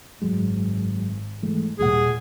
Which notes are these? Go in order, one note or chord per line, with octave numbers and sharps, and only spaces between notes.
G#1 F#2 F#3 G#3
E3 G#3 A3
D#2 A#2 G3 G#4 F#5